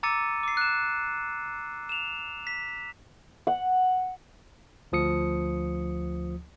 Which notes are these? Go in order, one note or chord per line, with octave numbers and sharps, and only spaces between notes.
A#5 D6 E6 A6 C#7 D#7
D6 C7
F#6 E7
E7 F7
B6
F#5
D2 F3 D#6 C#7